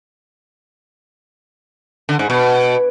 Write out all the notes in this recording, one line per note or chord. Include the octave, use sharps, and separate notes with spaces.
D3
G#2
B2